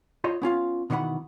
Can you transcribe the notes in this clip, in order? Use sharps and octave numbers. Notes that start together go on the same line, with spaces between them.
F4 C5 C#5 D#5
B3 C#4 F4 F5
B2 D#3 E3 C#5 F#5 B5